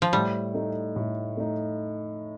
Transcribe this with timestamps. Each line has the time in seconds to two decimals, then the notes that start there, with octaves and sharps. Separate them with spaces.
0.02 F3
0.13 A2 G3
0.54 A3 D#4
0.96 A2
1.37 A3 D#4